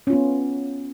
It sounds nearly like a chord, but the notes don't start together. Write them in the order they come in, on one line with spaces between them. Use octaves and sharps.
C#4 F4 B3